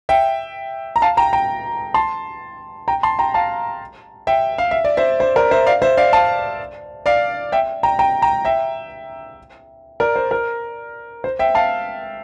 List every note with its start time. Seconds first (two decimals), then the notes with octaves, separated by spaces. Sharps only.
0.09 E5 G5
0.96 A#5
1.02 F5 A5
1.17 G5 A#5
1.33 G5 A#5
1.94 A5 C6
2.88 G5 A#5
3.03 A5 C6
3.19 G5 A#5
3.34 F5 A5
4.27 E5 G5
4.58 F5
4.71 E5
4.85 D5
4.97 C5 E5
5.20 C5
5.36 A#4 D5
5.51 C5 E5
5.67 D5 F5
5.82 C5 E5
5.97 D5 F5
6.13 F5 A5
7.06 D5 F5
7.52 E5 G5
7.83 G5 A#5
7.99 G5 A#5
8.22 G5 A#5
8.45 E5 G5
10.00 A#4 D5
10.16 C5
10.31 A#4
11.24 C5
11.39 E5 G5
11.55 F5 A5